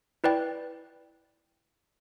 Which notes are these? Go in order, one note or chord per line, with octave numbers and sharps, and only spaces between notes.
E4 B4 D5 G5